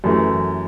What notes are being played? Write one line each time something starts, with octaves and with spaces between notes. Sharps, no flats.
F#2 E3 A3